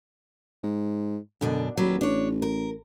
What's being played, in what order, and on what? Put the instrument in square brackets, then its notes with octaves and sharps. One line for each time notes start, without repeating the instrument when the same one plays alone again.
[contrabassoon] G#2
[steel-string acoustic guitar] F#2 B2 D4 [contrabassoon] D3
[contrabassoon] D#1 [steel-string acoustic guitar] F#3 G3 B4
[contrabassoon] A1 [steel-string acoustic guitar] D4 C#5
[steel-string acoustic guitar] A#4